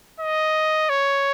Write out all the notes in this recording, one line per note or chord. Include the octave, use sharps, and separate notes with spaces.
D#5
C#5